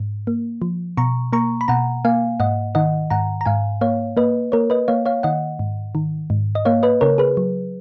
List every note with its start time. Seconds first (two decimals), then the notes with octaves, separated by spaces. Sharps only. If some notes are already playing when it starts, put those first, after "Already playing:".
Already playing: G#2
0.27 A#3
0.62 F3
0.97 B2 A#5 C#6
1.33 A#3 A#5 C#6
1.61 B5
1.68 B2 F#5 A#5
2.05 A#3 F5 G#5
2.40 G#2 D#5 F#5
2.75 D#3 D#5 F#5
3.10 G#2 F#5 A#5
3.41 A#5
3.46 G#2 F5 G#5
3.81 A#3 C#5 F5
4.17 A#3 B4 D#5
4.52 A#3 A#4 C#5
4.70 B4 D#5
4.88 A#3 C#5 F5
5.06 C#5 F5
5.23 D#3 D#5 F#5
5.59 G#2
5.95 D#3
6.30 G#2
6.55 D#5
6.65 A#3 C#5 F5
6.83 B4 D#5
7.01 C#3 A#4 C#5
7.18 G#4 B4
7.37 F#3